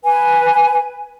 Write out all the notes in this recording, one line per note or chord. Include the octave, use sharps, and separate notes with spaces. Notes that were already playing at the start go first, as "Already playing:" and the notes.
B4 G#5